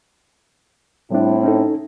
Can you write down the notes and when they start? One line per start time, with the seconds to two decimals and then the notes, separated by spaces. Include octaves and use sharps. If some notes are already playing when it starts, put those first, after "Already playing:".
1.12 A2 G3 C4 D4 E4
1.43 C#4 D#4 A4